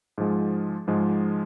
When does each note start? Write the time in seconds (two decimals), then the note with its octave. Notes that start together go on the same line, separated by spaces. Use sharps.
0.18 G#2 F3 G#3
0.88 G#2 F3 G#3